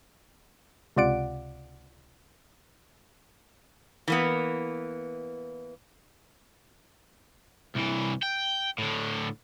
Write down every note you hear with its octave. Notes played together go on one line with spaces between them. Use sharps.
C#2 C3 F4 D5 F#5 D7
E3 A#3 B3
C2 E3
G5
A2 D3